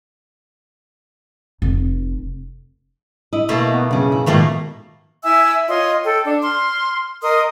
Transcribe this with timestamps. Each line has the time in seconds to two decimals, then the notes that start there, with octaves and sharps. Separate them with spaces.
1.62 F1
3.33 E4 D#5
3.49 B2 A3 A#3
3.72 B3
3.91 F#2 C#3 C#4
4.12 E4
4.26 G#2 B2 D#3 F3 A3 A#3 F4
5.23 E4 E5 G#5 E6
5.68 F4 C#5 D#5 C6
6.05 A4 G5
6.25 D4
6.43 C6 F6
7.22 A#4 D#5 C6 D#6